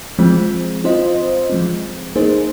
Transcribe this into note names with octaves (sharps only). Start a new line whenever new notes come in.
F3 G#3 C4
C4 F4 C5 D#5
F3 G#3 C4
A#3 D#4 G#4 C5